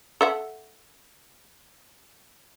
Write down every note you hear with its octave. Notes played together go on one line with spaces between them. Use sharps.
A4 E5 F#5